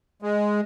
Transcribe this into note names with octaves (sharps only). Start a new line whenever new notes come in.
G#3